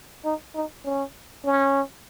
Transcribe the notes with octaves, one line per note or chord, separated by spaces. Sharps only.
D#4
D#4
C#4
C#4